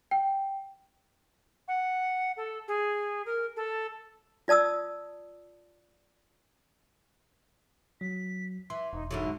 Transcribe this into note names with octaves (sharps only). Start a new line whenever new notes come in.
G5
F#5
A4
G#4
A#4
A4
F4 D5 A5 D#6 E6
F#3 B6
E3 E5 C6
E1 D#4
G#2 D3 F#3 E4